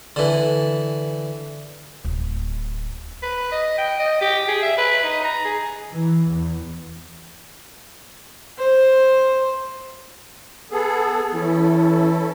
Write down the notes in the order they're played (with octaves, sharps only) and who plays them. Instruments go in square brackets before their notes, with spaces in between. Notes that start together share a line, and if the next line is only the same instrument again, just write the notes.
[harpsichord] D3 E3
[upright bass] D1
[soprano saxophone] B4
D#5
G5
D#5
G4
G#4
E5
B4
D#4
A#5
G#4
[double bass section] E3
E2
[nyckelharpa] C5
[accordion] B3 G#4 A4
[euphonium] E3 [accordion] C#4 E4 A4